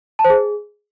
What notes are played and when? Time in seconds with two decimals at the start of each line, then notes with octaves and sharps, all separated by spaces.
0.19 A5
0.25 C5
0.30 G#4